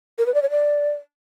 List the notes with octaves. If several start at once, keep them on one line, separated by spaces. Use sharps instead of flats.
A#4
B4
D5
C#5
D5